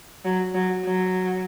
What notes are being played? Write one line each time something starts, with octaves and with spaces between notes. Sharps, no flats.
F#3
F#3
F#3